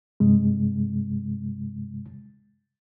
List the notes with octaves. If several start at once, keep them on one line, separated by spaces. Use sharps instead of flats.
G2 C3 G#3